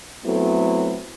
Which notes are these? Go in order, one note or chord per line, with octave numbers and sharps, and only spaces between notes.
F#3 A3 B3 C4 E4 A4